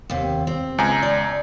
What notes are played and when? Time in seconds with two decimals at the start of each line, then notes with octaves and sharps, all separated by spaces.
0.10 D#2 C3
0.47 C4
0.78 C#2 G#5 A#5
1.03 D5